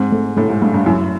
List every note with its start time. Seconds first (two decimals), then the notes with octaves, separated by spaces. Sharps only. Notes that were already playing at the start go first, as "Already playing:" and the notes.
Already playing: G#2 C4
0.12 A3
0.37 A2 A3
0.50 G#2
0.62 G2 A3
0.74 G2
0.86 F#2 E4